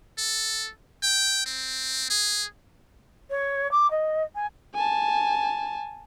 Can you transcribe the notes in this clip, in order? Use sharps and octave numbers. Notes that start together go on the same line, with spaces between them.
A4
G5
C4
G#4
C#5
D6
D#5
G#5
G#5 A5